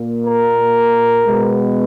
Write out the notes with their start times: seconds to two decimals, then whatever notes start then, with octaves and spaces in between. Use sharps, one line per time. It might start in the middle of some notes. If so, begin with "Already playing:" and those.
Already playing: A#2 A#3
0.27 A#4
1.26 B2 G#3 B3